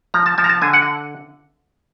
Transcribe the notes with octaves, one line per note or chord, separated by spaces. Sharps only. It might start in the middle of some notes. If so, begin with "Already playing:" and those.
F3 A#5
A5
F3 A5
A#5
A5
D3 G#5
F#5